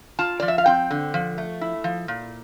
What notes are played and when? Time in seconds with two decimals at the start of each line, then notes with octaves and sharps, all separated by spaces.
0.19 F4 A5
0.40 F3 D5
0.48 E5
0.58 F5
0.66 C4 G5
0.91 D3
1.14 F3
1.38 A3
1.61 E4
1.84 F3
2.08 A#2